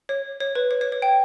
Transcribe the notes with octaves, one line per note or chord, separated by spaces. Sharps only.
C#5
C#5
B4
C#5
C#5
C#5
G5